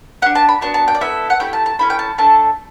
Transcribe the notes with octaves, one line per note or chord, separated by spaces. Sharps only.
D4 G4 F#5
A5
B5
B3 D4 F#4 A5
A5
G5
D5
B3 E4 A4 E5
F#5
A3 E4 G4 G5
A5
A5
C#4 E4 A4 B5
G5
A5
A3 D4 A4 A5